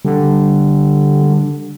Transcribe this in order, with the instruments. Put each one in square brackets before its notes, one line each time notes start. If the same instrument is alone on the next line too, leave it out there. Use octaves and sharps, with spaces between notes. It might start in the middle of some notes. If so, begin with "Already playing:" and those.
[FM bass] D3 [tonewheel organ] G3